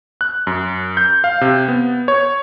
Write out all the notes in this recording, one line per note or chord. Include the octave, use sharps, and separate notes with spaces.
F#6
F#2
G6
F5
C3
B3
C#5